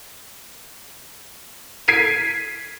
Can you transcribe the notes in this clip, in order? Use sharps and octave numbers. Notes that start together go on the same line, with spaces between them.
G#6 B6 C7 D7 D#7